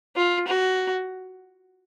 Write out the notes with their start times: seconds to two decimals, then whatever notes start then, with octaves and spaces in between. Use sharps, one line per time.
0.16 F4
0.47 F#4